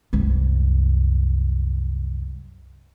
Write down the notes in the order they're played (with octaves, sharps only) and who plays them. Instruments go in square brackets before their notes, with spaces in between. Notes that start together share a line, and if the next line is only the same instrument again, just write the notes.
[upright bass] C2 F#2